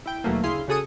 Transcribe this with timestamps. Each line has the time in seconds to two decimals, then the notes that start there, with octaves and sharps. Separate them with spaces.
0.06 E4 G5
0.24 D#2 B2 F#3 A3 A#3
0.44 D2 C#3 E4 G#4 F5 C6
0.68 C#3 F#4 G#4 A4 D#6 C#7